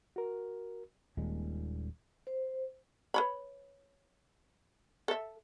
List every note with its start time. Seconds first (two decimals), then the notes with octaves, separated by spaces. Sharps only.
0.16 F#4 A#4
1.17 D#1 D#2 A#2 G#3
2.27 C5
3.14 B4 C#5 B5
5.08 A4 E5